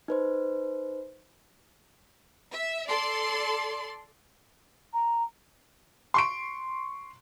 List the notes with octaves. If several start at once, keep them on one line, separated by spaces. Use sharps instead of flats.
D#4 B4 C5
E5
A4 D5 C6
A#5
C6 C#6 D7